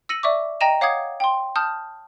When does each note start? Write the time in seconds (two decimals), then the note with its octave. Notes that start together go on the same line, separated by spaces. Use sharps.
0.09 E6 A#6 C#7 D#7 F#7
0.23 D5 E5 C#6 D6
0.61 D#5 G5 A#5 A#6 D#7 E7
0.81 C#5 F5 F#5 D6 D#6 G#6
1.20 G5 C6
1.56 A5 D#6 F6 G6